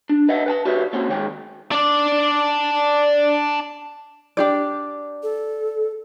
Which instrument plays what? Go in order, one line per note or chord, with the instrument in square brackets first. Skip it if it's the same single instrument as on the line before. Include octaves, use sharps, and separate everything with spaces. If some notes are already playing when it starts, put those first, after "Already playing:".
[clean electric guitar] D4
B4 D#5 E5 F#5
B4 G5 A5
F#4 G4 B4 C#5 D5 E5
A#3 C4 C#4 F#4 C#5 F#5
D#3 G#3 C#5 G5
[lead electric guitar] D4 D5
[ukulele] D4 G4 D5
[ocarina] A4